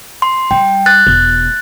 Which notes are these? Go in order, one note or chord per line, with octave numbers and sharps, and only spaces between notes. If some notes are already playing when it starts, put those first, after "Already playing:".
C6
G3 G5
F#6 A6
E1